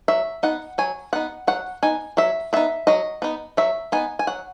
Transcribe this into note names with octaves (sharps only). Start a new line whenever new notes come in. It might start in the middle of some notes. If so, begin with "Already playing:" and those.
F#3 E5
B3 D#4 F#5
F#3 G#5
B3 D#4 F#5
F#3 F#5
B3 D#4 G#5
F#3 E5
B3 D#4 E5
F#3 D#5
B3 D#4
F#3 E5
B3 D#4 G#5
G#5
F#3 F#5